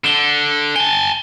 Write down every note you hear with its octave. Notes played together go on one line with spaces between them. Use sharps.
D3 E7 G7
G#5 A5 G7